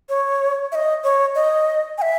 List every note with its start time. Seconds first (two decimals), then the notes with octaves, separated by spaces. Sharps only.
0.09 C#5
0.72 E5
0.75 D#5
1.04 C#5
1.35 D#5
1.98 G#5
2.02 E5